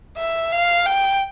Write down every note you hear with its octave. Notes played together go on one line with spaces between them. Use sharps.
E5
F5
G5